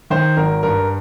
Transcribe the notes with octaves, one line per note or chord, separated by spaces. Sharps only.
D#3 C5
G#1 A#4
G2 A#4